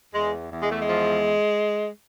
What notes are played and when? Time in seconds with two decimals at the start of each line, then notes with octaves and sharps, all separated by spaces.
0.13 E2 G#3
0.50 E2
0.62 G#3
0.70 A3
0.79 G#3
0.87 F3